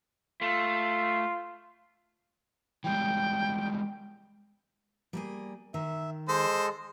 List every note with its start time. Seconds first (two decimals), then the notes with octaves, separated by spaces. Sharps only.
0.41 A3 F4
2.84 E3 G3 G#3 G5
5.13 G3 A#3 G#4
5.74 D#3 E5
6.28 G#3 A4 C5 D#5